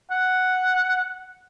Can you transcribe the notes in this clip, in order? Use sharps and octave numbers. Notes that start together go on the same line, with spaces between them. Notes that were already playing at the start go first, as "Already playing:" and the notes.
F#5